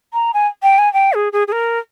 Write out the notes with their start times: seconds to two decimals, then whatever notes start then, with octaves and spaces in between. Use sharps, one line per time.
0.13 A#5
0.34 G#5
0.63 G5
0.78 G#5
0.93 G5
1.13 G#4
1.33 G#4
1.48 G#4
1.52 A#4